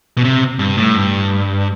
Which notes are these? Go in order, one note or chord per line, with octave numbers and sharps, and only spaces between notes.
B2
C3
G2
A2
G2